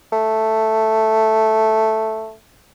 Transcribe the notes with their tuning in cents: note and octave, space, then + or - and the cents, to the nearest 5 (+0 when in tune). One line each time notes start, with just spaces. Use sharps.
A3 +0